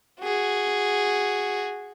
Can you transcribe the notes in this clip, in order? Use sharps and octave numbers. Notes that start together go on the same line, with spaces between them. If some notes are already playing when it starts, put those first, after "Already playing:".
F#4 G#4